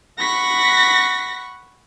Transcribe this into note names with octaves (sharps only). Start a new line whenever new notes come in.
F#5 B5 C#6 A#6 B6